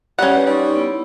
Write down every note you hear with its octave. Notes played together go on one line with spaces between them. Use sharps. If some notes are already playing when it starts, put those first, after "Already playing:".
G3 C#4 F#5
B4
G3 D#4 C6 C#6
B3 E4